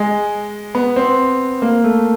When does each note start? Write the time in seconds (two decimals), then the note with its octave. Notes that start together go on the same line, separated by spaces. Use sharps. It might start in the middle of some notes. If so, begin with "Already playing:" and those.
Already playing: G#3
0.75 B3
0.96 C4
1.62 A#3
1.84 A3